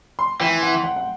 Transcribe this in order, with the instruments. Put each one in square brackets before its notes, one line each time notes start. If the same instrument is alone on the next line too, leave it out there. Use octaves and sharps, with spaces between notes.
[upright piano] C6
[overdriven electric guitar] E3 [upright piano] G5
[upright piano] F#5
F#5
F#5